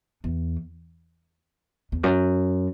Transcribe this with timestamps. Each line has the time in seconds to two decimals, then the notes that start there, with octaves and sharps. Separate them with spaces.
0.24 E2
1.92 E2
2.03 F#2